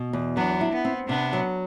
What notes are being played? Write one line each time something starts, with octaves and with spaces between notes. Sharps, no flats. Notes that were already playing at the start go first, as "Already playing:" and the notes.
Already playing: B2
E2
F#3 B3 D4
E4
B3
C4
C3 B3 D4
F#3